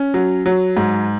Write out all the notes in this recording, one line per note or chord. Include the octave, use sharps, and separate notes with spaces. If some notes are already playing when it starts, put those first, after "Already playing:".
Already playing: C#4
F#3
F#3
G#2